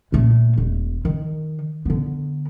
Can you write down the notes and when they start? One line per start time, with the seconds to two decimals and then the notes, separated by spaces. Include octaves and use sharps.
0.12 A#2 A3
0.57 E1
1.05 D#3
1.85 D3 B3